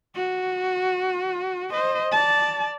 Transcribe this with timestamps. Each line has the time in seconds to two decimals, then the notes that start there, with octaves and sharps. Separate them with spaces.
0.15 F#4
1.71 C5 D#5
2.12 D5 A5